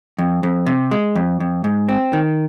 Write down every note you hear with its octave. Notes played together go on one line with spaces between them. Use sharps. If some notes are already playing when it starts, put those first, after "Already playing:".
F2
F2
C3
G#3
F2
F2
G#2
C4
D#3